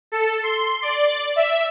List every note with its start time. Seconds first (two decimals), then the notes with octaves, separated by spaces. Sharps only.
0.12 A4
0.43 C6
0.82 D5
1.36 E5